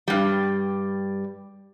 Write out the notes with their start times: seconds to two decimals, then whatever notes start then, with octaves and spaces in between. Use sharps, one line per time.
0.08 G2 G3